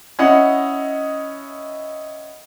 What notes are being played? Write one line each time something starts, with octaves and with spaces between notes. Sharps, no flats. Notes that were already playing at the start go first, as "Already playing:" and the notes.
C#4 E4 D#5 F#5